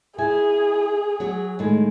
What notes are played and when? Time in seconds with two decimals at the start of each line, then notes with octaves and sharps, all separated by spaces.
0.18 E4 G#4 G#5
1.20 F#3 F#4
1.59 A2 D#3 G#3